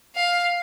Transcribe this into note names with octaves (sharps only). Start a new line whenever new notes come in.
F5